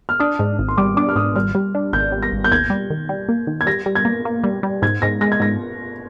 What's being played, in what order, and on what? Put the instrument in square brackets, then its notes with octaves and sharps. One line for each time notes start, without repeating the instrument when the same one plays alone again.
[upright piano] F6
[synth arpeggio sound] D4 [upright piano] D#6
[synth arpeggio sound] G#2
G#1
[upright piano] C6
[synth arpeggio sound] G3 [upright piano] D6
[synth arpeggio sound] D4 [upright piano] D6
[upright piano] F6
[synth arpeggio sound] G#1 [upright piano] D#6
[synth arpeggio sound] G3 [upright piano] F6
[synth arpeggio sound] G3
D4
[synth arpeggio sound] G#1 [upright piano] G6
[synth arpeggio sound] G3
[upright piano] A#6
[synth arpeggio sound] G#1
[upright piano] G6
[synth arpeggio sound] D#2 [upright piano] G#6
[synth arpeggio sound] G3
D#3
G3
A#3
D#3
[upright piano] G#6
[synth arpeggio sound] G3 [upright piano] A#6
[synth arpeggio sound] G3
[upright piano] G#6
[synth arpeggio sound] A#3
A#3
G3
G3
[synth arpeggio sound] G#2 [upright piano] G#6
[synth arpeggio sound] G#2 [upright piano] A#6
[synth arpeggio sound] G#3 [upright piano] A#6
[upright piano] G#6
[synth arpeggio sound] G#2 [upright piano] A#6